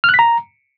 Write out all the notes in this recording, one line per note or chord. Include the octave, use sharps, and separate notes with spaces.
F6
F#6
B6
A#5